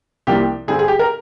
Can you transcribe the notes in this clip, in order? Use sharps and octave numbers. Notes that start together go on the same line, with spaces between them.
C2 C3 F3 A#3 D4 G4
G2 D3 G3 C4 G#4
G#4
G4
A#4